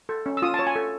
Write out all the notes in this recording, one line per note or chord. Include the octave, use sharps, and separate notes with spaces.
A4
C#4
E6
F4 D#6
A5
C#5
G#5
A4